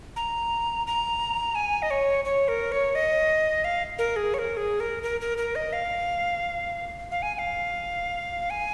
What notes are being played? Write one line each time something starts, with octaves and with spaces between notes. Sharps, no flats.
A#5
A#5
G#5
D#5
C#5
C#5
A#4
C#5
D#5
F5
A#4
G#4
C#5
A#4
G#4
A#4
A#4
A#4
A#4
D#5
F5
F5
G#5
G#5
F5
G#5